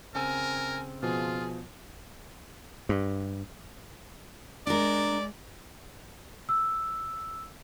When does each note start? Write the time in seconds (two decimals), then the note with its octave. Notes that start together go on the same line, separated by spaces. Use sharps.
0.15 C#3 C4 A#4 G#5
1.03 B2 F3 F4 G#4
2.89 G2
4.67 G#3 D4 A#4 D5
6.49 E6